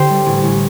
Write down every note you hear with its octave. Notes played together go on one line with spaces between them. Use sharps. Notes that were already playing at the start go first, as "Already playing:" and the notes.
Already playing: D3 G4 C5
G3
A1
A1